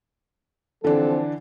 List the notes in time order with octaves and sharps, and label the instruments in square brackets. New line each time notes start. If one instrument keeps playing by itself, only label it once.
[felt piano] D3 E3 D4 [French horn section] F3 C4 A4